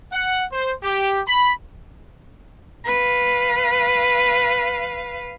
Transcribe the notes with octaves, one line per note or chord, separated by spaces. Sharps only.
F#5
C5
G4
B5
B4 F5